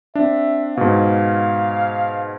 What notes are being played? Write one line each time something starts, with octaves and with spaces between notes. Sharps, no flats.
C4 D4 E5
G#2 B2 F5